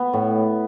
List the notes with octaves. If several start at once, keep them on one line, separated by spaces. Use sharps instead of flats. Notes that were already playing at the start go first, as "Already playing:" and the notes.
Already playing: B3
A2